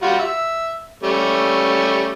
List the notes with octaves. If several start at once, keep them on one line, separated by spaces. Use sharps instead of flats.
G3 F4 F#4
E5
G3 A3 C#4